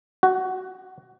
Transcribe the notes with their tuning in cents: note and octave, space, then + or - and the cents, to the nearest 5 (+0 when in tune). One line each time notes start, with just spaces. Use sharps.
F#4 +15